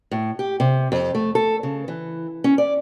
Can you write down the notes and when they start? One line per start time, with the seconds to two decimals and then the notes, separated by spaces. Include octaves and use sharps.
0.11 A2
0.39 G4
0.60 C3
0.92 F2
1.15 A3
1.35 A4
1.63 C#3
1.88 E3
2.44 C#4
2.58 D5